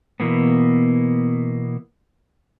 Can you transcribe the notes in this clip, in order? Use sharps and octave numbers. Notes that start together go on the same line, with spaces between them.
B2 E3 A#3 B3